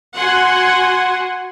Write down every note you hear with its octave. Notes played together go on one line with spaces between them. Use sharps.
F#4 F#5 G#5 C6